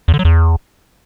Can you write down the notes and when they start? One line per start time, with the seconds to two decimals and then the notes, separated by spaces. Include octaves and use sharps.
0.08 E2
0.14 D3
0.19 F#3
0.25 E2